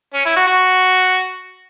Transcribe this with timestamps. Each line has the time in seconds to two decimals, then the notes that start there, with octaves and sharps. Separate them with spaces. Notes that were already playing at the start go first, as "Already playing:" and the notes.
0.14 C#4
0.25 E4
0.36 F#4
0.47 F#4